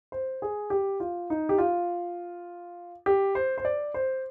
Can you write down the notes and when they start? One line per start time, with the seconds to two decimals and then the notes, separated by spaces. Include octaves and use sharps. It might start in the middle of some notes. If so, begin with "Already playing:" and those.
0.12 C5
0.42 G#4
0.70 G4
1.00 F4
1.30 D#4
1.49 G4
1.58 F4
3.06 G4
3.35 C5
3.58 C5
3.65 D5
3.94 C5